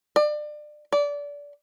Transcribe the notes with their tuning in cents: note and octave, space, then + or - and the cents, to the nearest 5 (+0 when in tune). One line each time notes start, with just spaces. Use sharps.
D5 +30
D5 -25